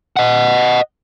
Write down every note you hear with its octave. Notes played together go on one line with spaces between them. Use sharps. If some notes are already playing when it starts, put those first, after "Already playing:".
D#5 F#5